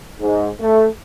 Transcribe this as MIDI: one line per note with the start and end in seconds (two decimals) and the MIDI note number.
0.21 0.48 44
0.60 0.87 57